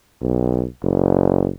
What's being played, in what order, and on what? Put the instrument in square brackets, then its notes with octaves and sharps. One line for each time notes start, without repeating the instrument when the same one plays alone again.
[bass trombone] B1
F#1